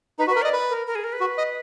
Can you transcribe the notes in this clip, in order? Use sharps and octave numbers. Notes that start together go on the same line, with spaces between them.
D#4 B4
F#4
B4
A#4
D5 D#5
B4
A#4
A#4
G#4
A#4
B4
F#4
D#5